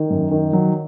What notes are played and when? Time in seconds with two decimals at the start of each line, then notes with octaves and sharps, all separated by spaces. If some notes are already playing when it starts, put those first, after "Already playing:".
Already playing: D#3
0.10 F#2
0.31 D#3
0.53 F#3